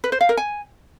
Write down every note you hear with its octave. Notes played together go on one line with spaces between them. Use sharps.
B4
C5
F5
A#4
G#5